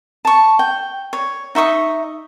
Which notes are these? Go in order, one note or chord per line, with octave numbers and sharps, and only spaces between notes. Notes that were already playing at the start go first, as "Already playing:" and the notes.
A5 C#6
G5
C#5
D#4 E5 C#6 D#6